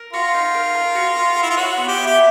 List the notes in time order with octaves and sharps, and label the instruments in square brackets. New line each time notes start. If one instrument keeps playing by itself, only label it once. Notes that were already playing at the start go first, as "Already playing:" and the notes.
Already playing: [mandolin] A#4
[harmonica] F4 [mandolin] F#4
[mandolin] D#4
A#4
A#4
F#4
F#4
A#4
[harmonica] E4
F4
[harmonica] F#4 [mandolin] C#5
[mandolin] B3
[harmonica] G4
[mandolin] E4
[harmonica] G4